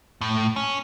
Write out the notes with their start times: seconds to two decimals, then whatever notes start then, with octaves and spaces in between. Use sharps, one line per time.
0.21 A2
0.56 C#4